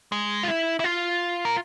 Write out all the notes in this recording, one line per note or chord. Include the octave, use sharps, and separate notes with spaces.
G#3
F4
E4
E4
F4
A#4